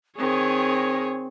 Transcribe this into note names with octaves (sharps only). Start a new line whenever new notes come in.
D#3 C4 G#4 C#5